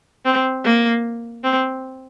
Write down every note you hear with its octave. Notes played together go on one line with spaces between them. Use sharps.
C4
A#3
C4